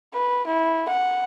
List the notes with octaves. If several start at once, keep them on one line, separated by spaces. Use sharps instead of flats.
B4
E4
F#5